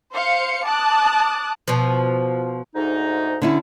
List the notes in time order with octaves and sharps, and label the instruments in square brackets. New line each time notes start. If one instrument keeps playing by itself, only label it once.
[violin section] C5 F5 C#7
A5 D6 D#6 F#6
[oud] B2 F3
[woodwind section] D2 G#2 D#4
[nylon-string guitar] D3 C#4 E4